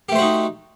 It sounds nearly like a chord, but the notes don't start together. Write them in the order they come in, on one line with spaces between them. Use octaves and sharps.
G4 A3 C5 F#4 D#4